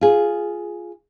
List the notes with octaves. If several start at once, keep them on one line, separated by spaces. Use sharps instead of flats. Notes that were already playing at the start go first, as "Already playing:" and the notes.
F4 G#4